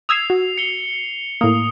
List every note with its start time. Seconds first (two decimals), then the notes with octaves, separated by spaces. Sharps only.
0.09 D#6 E6 G#6 C7 F7
0.30 F#4
0.58 C#7 G7
1.41 A2 A#3 D#6